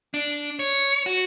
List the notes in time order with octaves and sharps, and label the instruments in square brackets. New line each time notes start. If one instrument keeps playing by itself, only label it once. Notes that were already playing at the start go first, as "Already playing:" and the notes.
[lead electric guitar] D4
C#5
F#4